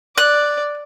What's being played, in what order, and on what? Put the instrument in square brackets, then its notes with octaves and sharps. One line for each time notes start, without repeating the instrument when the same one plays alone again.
[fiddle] D5 [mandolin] F#6